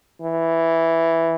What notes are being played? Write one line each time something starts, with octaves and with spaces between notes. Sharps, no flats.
E3